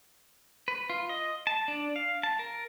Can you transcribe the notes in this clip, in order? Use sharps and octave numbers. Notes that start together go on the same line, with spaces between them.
B4
F4
D#5
A5
D4
F5
A5
A#4